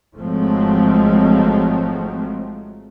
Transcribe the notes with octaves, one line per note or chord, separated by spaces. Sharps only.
G#1 F3 F#3 G#3 A3 C4